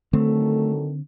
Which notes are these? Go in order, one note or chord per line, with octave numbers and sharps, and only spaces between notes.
D3 D#3 F#3 A3 C4 A4